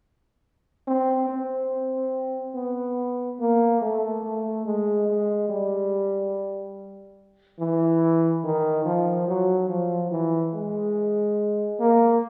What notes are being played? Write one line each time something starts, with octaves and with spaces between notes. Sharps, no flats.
C4
C4
B3
A#3
A3
A3
G#3
G#3
G3
E3
D#3
F3
F#3
F3
E3
G#3
A#3